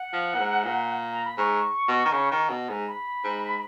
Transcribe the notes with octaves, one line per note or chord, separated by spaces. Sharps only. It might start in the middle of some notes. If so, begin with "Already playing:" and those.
Already playing: F#5
F3
A#2
G#2
A#2
A#5
B5
G#2 C#6
B2
D#3
C#3
D#3
B2
G#2
B5
G#2